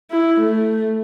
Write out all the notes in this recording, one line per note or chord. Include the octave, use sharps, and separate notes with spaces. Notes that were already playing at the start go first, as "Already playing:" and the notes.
E4
A3